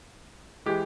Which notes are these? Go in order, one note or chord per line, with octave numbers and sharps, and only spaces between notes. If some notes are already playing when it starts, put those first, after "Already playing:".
E3 G#3 G4